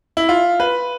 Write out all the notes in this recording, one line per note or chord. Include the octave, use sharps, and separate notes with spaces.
E4
F4
B4